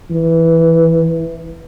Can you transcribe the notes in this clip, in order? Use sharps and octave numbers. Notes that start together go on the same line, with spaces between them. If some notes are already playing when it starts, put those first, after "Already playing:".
E3